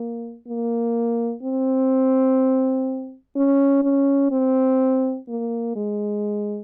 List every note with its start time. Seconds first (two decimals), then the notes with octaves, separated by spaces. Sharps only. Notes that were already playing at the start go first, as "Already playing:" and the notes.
Already playing: A#3
0.47 A#3
1.43 C4
3.36 C#4
3.83 C#4
4.32 C4
5.29 A#3
5.76 G#3